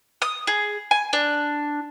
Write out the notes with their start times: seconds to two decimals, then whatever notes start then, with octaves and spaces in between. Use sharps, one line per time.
0.22 D#6
0.47 G#4
0.91 G#5
1.13 D4